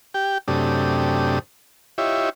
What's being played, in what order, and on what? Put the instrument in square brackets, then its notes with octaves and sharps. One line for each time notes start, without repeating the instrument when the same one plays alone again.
[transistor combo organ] G4 G5
F#2 C3 A3 D4 G4 D#6
E4 F4 G4 C#5 D#5 E5